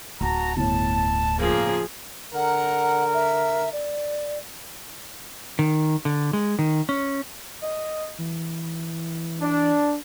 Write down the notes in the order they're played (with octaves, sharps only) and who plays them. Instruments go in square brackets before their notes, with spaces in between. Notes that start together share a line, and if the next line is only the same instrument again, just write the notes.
[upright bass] D1 [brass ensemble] F#4 A5 A#5
[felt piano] G1 A2 [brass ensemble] A5
[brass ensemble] C#3 A#3 [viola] F3 G#4
[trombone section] D3 A#4 [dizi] F#5
[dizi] E5
D5
[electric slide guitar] D#3
D3
G#3
D#3
C#4
[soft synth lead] D#5
E3
[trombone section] D4